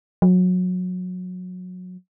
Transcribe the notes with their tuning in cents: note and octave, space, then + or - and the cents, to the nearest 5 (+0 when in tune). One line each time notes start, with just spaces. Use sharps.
F#3 -25